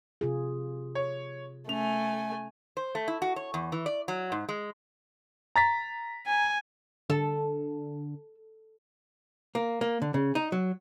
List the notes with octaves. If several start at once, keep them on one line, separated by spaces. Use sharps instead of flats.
C3 F4 G#4
C#5
A3 C#4 G#5 F7
C5
A3
E4
F#4
C#5
E2
E3
D5
F#3
G#2
G#3
A#5 A6 B6
G#5
D3 A4
A#3
A#3
D3
C#3
D#4
F#3